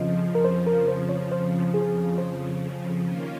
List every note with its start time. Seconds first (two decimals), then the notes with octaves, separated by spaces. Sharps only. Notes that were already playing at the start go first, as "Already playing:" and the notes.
Already playing: F2 C#3 F3 D#5
0.35 A#4
0.45 C5
0.67 A#4
0.88 C5
1.09 C#5
1.32 C5
1.74 G#4
2.18 C5
3.04 D#3 A#3 C#4 F4